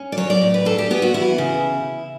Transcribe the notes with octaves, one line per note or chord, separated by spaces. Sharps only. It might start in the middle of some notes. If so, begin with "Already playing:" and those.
Already playing: C#4
D5
F#3 C#5
D5
A2
B4
D4 A4
G4
B3 G4
F#4
E3 E4
C#3